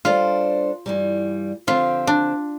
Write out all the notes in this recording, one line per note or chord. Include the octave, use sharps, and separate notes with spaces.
G3 D4 F4 A4 C5
G2 E3 G3
D3 F3 C4 F4 G4
D4